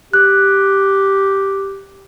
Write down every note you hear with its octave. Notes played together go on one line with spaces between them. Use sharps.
G4 F#6